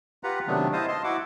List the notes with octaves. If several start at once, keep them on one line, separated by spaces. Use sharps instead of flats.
F4 G4 B4 F#5 A#5
C3 D#3 F#3 A3 B3 D4
E4 C5 D#5 F5 A5 D#6
D#5 A5 C6
E4 F#4 F#5 D6